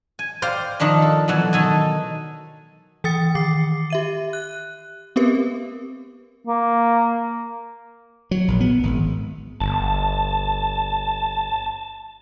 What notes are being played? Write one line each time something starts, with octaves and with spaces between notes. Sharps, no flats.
G#5
C5 D5 F5 G5
D#3 F3 D4 A#4
A4
B2 E3 F#3 A3
D#3 A4 G#5
E3 G5 D#6 A6 C#7
D#3 D6 C7
G4 E5 D#7
F#6
B3 C4 G4 A#4 B4
A#3
F#3
A#1
B3
G#1
G1 A5